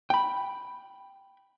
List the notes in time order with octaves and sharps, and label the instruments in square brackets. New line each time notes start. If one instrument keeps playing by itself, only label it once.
[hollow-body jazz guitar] G5 B5